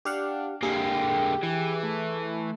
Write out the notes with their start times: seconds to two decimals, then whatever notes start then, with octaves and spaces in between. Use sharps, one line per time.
0.05 D4 G4 F5 F#5
0.63 D3 A#3 G4 G#4
1.43 E3
1.83 A3